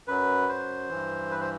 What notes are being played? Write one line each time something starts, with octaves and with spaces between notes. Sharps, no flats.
F#2 F#3 B4
C5
G2 E3
B4
C5